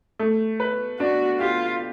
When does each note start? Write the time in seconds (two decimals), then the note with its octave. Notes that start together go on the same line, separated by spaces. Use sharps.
0.19 A3
0.60 B4
0.99 D4 F#4
1.40 F4 G4